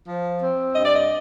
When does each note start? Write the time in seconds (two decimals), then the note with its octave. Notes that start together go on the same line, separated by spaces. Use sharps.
0.07 F3
0.41 C4
0.74 G2 D#5
0.84 D5
0.96 D#5